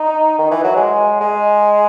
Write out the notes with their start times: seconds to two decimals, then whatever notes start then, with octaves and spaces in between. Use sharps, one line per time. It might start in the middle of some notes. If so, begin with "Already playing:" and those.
Already playing: D#4
0.39 D#3
0.51 E3
0.64 F#3
0.76 G#3
1.21 G#3